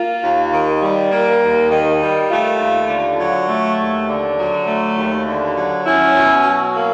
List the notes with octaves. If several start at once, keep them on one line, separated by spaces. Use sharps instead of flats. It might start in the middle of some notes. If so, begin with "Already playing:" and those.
Already playing: A#3 F4
D#2
D#3
G3
A#3
D#2
D#3
G3
A3 F4
D#2
D3
F#3
A3
D#2
D3
F#3
A3
D#2
D3
F#3
C#4 E4
B2
F#3
A#3